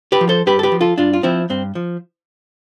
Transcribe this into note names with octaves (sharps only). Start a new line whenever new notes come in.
G4 B4
F3
A4 C5
G2 G4 B4
A4
G4 B4
F3
F4 A4
G2 D4 F4
F4
F3 C4 E4
G2 C4
F3